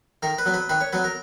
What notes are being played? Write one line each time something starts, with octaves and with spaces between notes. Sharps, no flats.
D#3 A#4
B4
F#3 B3
B4
D#3 B4
C#5
F#3 B3 B4
A#4